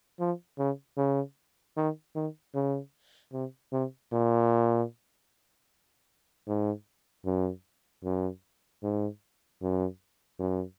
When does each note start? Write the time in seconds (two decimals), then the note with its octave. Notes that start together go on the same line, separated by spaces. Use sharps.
0.20 F3
0.58 C#3
0.97 C#3
1.77 D#3
2.15 D#3
2.55 C#3
3.33 C3
3.72 C3
4.12 A#2
6.47 G#2
7.26 F#2
8.04 F#2
8.83 G#2
9.62 F#2
10.39 F#2